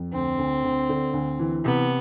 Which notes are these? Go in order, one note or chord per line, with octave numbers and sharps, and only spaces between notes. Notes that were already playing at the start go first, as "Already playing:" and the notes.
Already playing: F2
D2 C4
D2
D2
D3
D2
E3
C3 B3